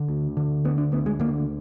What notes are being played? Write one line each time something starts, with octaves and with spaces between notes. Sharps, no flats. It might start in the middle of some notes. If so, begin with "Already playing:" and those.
Already playing: D3
D2
D3
D2 B3
D4
D2 B3
G#3
D3 A#3